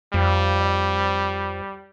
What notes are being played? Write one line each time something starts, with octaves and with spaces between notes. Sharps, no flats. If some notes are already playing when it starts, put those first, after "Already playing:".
F2 G3